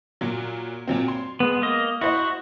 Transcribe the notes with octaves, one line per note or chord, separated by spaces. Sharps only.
A#2 F#3
A#2 F#3 C4
C6
G#3 B3
A#3 D#5
E4 F#4 C5 D#5